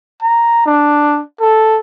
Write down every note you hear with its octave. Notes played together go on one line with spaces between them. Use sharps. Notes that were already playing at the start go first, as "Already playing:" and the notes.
A#5
D4
A4